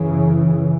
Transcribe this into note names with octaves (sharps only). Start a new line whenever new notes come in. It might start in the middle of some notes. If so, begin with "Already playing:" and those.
Already playing: F#2 C#3 E3